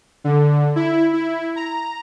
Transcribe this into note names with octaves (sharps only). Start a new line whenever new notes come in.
D3
E4
E4
A#5